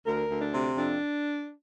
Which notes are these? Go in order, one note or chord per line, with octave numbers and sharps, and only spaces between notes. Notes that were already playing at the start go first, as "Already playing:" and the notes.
D2 A#4
D2
D4
C3
F2 D4